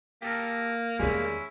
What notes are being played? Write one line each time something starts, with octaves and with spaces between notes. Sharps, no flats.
A#3 G4 A4 A#4
E2 D#3 G3 G#3 C#4 E4 G#4